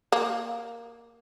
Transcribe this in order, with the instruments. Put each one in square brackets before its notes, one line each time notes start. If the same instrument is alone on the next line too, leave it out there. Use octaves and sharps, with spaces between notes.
[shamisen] A#3